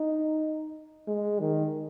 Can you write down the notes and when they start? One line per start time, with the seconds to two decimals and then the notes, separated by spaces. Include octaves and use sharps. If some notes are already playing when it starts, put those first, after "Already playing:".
Already playing: D#4
1.07 G#3
1.40 D#3